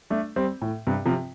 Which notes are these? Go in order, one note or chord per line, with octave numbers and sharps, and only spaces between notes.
A3 D4
G3 C4
A2
G2 C3
C3 F3